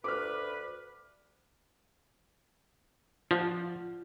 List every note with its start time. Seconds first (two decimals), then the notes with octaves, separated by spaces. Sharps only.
0.04 D2 B4 D6 F6
3.31 F3 F4 D5 F#5